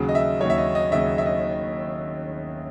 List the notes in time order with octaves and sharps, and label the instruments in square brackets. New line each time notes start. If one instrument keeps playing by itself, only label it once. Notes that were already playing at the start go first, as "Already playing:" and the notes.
Already playing: [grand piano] D#2 C#3 F#3
D#5
E5
D#2 C#3 F#3 C#5
E5
D#5
D#5
D#2 C#3 F#3 E5
E5
D#5